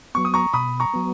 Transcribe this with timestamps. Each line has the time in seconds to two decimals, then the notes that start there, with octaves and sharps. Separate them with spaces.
0.15 F#3 B3 C#6
0.25 D#6
0.34 A#5 C#6
0.53 B2 B5 D#6
0.80 A#5 C#6
0.93 F#3 B3